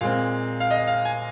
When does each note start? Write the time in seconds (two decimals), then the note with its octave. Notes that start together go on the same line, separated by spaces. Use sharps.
0.01 A#2 G#3 C4 F5
0.60 F5
0.71 D#5
0.87 F5
1.05 G#5